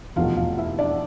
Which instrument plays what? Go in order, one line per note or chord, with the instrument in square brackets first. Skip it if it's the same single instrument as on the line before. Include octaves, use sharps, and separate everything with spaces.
[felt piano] F1 E2 B2 A3 F4 F5
F4 F5
E4 E5
D4 D5